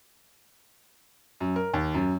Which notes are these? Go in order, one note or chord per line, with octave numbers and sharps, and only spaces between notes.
F#2
A#4
D#2
F#2